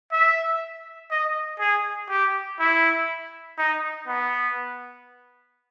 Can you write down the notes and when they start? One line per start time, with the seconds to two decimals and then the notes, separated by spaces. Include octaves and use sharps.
0.12 E5
1.11 D#5
1.60 G#4
2.10 G4
2.60 E4
3.58 D#4
4.07 B3